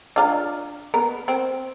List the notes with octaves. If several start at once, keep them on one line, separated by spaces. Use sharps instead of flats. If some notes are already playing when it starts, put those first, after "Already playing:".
D4 F4 A#5
B3 A#4
C4